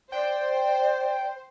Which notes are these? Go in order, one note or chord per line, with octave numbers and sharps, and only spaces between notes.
C5 D5 G5